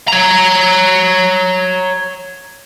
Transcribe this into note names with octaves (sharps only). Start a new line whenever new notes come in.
C#5 A#5